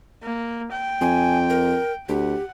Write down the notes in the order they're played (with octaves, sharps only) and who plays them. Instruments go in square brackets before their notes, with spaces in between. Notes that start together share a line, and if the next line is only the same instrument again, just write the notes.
[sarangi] A#3
G5
[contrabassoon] F2 [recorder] G#5
[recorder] A#4
[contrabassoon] D2 [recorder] G4 [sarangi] F#5